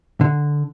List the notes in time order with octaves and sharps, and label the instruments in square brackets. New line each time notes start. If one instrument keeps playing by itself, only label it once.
[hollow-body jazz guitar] D3